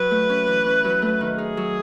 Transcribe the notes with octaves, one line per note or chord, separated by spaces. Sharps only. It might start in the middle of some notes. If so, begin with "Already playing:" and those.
Already playing: F#3 B4
A3
C#4
E3
C#4
F#3
A3
D#3
D#4 G#4
F#3